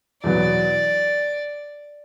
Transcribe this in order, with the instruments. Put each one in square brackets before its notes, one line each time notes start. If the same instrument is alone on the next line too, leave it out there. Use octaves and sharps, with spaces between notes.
[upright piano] E2 B2 F#3 B3 [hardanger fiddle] D5